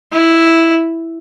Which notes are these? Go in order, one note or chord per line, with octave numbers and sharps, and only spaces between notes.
E4